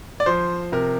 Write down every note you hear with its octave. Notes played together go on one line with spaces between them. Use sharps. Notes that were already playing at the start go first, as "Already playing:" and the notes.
D5
F3 C5
C3 A#4